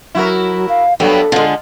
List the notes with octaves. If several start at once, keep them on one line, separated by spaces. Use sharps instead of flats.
F#3 E4 F#4 A#4
F5
G2 F#3 G3 B3 A4
D3 G#3 F4